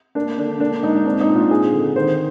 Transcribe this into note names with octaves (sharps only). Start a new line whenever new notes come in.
A#3 D4
D3 D4
A#3 D4
G#2 D#4
C4 D4
D#4
A#2
F4
C4 G#4
D3
D#3 C5